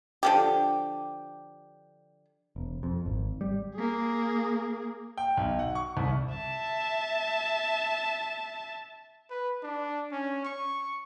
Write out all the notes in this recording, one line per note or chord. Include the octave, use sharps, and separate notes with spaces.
D3 F3 G4
E1
F2
G#1
G3
A#3 G#4
G5
B1
F#5
C#6
C2
E5 A5
B4
D4
C#4
C#6